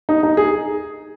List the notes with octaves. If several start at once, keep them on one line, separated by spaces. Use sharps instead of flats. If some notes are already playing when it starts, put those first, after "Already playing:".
D#4
D#4
G#4